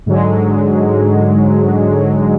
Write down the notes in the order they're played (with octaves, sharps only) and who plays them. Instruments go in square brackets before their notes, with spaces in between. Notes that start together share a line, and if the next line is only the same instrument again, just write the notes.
[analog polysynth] G#2 D3 F#3 G#3